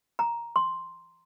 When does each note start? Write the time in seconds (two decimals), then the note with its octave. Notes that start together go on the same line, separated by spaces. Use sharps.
0.19 A#5
0.56 C6